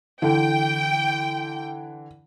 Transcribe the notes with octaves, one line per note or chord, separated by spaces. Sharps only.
D3 E3 G5